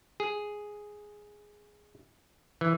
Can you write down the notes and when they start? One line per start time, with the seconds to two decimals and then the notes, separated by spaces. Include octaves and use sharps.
0.20 G#4
2.61 E3